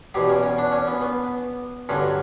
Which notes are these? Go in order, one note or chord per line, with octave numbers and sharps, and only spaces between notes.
E2 B2 F#3 G4
C#4
C#4
D4
C#4
B3
B3
G2 D3 F#3 C#4